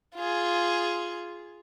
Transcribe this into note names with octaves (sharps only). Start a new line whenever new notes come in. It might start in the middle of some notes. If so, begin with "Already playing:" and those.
F4 G#4